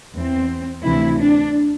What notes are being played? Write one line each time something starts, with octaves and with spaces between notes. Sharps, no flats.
E2 E3 C4
D2 C3 E3 E4
D4